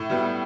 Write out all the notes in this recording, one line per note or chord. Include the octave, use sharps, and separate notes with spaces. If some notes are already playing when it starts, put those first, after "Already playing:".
Already playing: A2
G3 B3